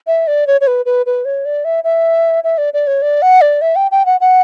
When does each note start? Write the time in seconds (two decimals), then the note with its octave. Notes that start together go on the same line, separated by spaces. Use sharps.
0.07 E5
0.27 D5
0.47 C#5
0.61 C#5
0.67 B4
0.85 B4
1.06 B4
1.25 C#5
1.45 D5
1.64 E5
1.84 E5
2.44 E5
2.58 D5
2.73 D5
2.87 C#5
3.02 D5
3.22 F#5
3.41 D5
3.61 E5
3.76 G5
3.91 G5
4.06 F#5
4.20 F#5